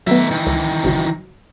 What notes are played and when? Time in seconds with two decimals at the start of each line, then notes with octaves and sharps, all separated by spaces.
0.07 D#3 F#3 A3 B3 E5
0.31 D#3 E3
0.47 C#2
0.84 G1 C#2 F#3